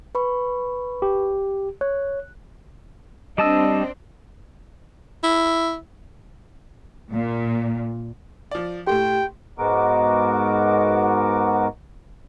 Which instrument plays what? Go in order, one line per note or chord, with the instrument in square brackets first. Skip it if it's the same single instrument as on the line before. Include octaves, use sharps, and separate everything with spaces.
[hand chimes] B4 B5 C#6
[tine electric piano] G4
[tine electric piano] C#5 [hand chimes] F#6
[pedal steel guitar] G3 A5 E6 [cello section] C4 D4 [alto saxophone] D#5
[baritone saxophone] E4
[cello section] A#2
[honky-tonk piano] F3 D5
[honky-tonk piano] A2 A3 C6 [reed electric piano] G4 [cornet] G5
[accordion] G#2 G#3 B3 F#4 A#4 D6